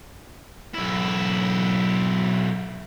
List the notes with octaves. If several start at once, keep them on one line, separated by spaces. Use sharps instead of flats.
B1 E4